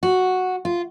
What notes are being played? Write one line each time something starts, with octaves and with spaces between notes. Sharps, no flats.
F#4
F4